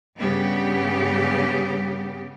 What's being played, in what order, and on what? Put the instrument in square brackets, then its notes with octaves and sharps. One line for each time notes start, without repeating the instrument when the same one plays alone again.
[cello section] G2 C#3 G3 B3 G4